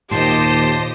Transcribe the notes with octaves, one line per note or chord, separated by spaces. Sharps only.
D#2 A#2 G4 C5 D#5 A5 C6